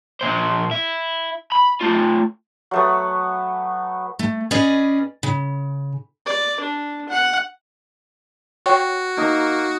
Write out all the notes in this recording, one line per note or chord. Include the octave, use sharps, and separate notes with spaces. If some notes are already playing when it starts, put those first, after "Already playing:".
A#2 C5
E4
B5
A3 F4
F#3 A3 B3
A3
C#4 G#4 B4 D5 D#5
C#3
D5
D4
F#5
F#4 C#5 G5 C#6
A#3 D#4